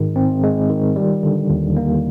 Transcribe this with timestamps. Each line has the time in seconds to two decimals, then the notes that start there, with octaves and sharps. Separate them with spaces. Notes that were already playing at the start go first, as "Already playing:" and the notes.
Already playing: G#2 D#3 G#3
0.16 C4
0.43 G#3
0.69 D#3
0.96 G3
1.23 D3
1.50 D#2
1.77 A#3